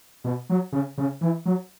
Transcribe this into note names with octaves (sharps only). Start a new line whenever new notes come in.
B2
F#3
C#3
C#3
E3
F#3